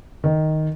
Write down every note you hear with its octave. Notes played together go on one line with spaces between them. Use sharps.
D#3